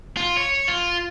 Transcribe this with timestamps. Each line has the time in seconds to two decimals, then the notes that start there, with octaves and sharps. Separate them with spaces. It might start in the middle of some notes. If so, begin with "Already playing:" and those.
0.17 F4
0.37 C#5
0.68 F4